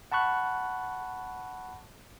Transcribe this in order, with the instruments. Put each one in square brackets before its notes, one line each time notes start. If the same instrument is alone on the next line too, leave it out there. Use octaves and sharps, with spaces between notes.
[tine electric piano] F#5 A5 B5 C#6 F#6